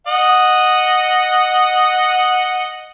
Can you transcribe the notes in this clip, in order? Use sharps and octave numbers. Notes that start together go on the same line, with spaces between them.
D#5 F#5